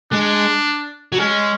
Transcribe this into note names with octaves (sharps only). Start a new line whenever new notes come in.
G#3 D4
F#3
G#3 C#4